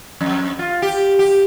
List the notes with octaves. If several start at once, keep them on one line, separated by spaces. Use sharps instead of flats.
F2
F4
G4
G4